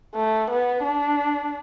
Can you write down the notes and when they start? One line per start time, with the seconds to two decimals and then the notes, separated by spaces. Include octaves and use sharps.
0.15 A3
0.50 B3
0.84 D4